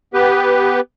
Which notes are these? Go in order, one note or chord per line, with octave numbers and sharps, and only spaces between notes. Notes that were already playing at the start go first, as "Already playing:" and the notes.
B3 G4 B4